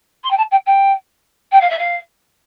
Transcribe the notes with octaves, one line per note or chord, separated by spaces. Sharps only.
C6
G5
A5
G5
G5
G5
F5
E5
F5